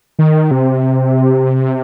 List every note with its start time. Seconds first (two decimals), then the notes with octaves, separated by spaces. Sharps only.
0.19 D#3
0.51 C3